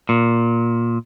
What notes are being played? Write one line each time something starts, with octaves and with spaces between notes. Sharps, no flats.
A#2